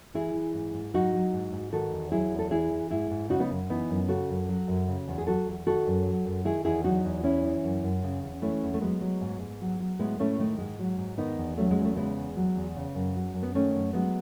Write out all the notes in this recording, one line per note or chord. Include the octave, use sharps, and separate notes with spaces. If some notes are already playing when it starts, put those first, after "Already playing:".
E3 E4 G#4
E3
G#2
G#2
F#3 D#4 F#4
F#3
G#2
G#2
D#3 F#4 A4
E2
F#3 E4 G#4
E2
A4
E3 E4 G#4
E3
G#2 E4 G#4
G#2
C#3 D#4 F#4
B3 D#4
F#2
E3 B3 D#4
F#2
C#3 F#4 A4
F#2
F#3
F#2
C#3
E2
G#4
F#3 F#4 A4
E2
D#3 F#4 A4
F#2
F#3
F#2
D#3 E4 G#4
E2 E4 G#4
F#3 D#4 F#4
E2
E3 C#4 E4
E3
F#2
F#2
C#3
E2
E3 A3 C#4
E2
A3
F#3 G#3 B3
F#3
G#2
G#2
F#3
F#3
A2 G#3 B3
A2 A3 C#4
D#3 A3
G#2 G#3
F#3
G#2
D#3 B3 D#4
E2
F#3 A3 C#4
G#3
E2
A3
C#3 G#3 B3
E2
F#3
E2
C#3
F#2
F#3
F#2
B3
D#3 A3 C#4
F#2
F#3 G#3 B3